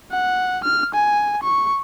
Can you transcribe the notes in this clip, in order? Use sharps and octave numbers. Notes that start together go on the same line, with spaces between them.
F#5
F6
G#5
C#6